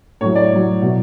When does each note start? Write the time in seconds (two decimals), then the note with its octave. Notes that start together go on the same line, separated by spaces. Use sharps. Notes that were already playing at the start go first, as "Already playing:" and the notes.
0.21 A2 F#3 C#5
0.35 D5
0.51 A2 F#3
0.81 B2 F#3